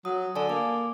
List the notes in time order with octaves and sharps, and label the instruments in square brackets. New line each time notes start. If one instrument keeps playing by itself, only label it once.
[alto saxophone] F#3 [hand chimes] D#6
[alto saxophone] D3 [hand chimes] D5 G#5 A5
[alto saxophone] A#3 [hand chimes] D6